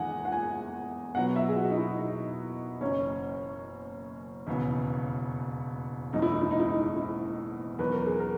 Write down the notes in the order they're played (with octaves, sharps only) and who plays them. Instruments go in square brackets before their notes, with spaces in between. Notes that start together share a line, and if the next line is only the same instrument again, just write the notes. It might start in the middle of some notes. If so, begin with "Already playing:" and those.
Already playing: [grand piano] E2 D#3 G#3 D#4 [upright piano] F#5 G#5
[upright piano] F#5
G#5
[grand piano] B2 F#3 B3 [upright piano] F#5
[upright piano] E5
G#4
F#4
D#4
E4
D#4
[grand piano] F#1 F#2 E3 [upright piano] C#4
[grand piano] E1 D#2 C#3 E3 B3
[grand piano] F#1 E2 B2 G#3 [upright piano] D#4
[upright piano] E4
D#4
E4
D#4
E4
D#4
E4
[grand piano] E2 D#3 F#3 [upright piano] B4
[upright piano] A#4
G#4
A#4